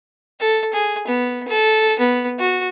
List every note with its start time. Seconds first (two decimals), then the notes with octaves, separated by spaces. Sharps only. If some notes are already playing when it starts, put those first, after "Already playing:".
0.40 A4
0.73 G#4
1.07 B3
1.48 A4
1.99 B3
2.39 F#4